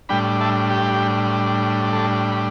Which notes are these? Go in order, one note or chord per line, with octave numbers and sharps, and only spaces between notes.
A2 G3 D4 G5 B5
E5 A5
G4
A4
B5